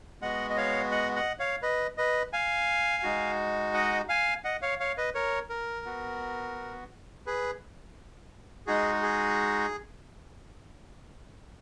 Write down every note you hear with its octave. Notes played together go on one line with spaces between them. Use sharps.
G#3 B3 F#4 D#5 F#5
D#5
C#5 F5
D#5 F#5
D#5 F#5
C#5 F5
B4 D#5
B4 D#5
F5 G#5
G#3 D#4 F#4
D#5 F#5
F5 G#5
D#5 F#5
C#5 F5
C#5 F5
B4 D#5
A#4 C#5
A#4
B3 F#4
G#4 B4
G#3 D#4 F#4 G#4
G#4